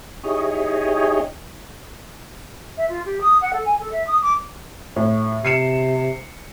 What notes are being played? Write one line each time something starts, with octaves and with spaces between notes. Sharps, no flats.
D#4 E4 G4 G#4 C#5 D#5
E5
F4
G4
D#6
F#5
A4
G#5
A4
E5
D#6
D6
A2
C3 C7 C#7 E7